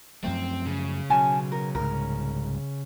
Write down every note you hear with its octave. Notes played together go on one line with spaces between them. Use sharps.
F#2 F3 A3 C4
C#3
B2 F#3 C#4 G#5 A5
A#4
C2 G#2 A#4